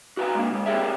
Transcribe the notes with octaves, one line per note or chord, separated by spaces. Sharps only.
F#4 B4 F5 A#5
G#3 A#3 D4
C#3 G#3
C4 G4 G#4 A#4 C#5 E5